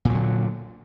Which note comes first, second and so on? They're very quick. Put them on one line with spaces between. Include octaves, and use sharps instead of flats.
A#2 F#3 D3